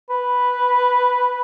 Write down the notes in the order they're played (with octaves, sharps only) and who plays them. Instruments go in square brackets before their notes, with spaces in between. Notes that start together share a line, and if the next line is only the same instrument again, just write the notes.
[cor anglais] B4